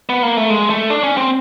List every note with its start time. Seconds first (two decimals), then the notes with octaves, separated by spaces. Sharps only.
0.09 B3
0.23 A#3
0.37 A3
0.50 G#3
0.70 A3
0.90 D4
1.04 C#4
1.17 C4